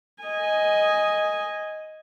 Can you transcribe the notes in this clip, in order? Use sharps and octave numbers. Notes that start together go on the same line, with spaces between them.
D#5 G#5